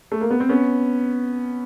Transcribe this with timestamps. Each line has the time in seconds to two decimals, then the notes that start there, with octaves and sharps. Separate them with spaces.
0.12 A3
0.21 A#3
0.30 B3
0.40 C4
0.49 B3 C#4